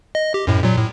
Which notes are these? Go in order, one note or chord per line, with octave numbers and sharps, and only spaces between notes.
D#5
G4
F#2 A2
A#2 F#3
A2